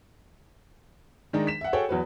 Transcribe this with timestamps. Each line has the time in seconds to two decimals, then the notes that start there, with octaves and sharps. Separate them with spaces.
1.33 D#3 G#3 D4 D#4
1.47 B6 E7
1.61 E5 F#5
1.73 F#4 G#4 A4 C#5 F#5 G5
1.89 E2 F#3 B4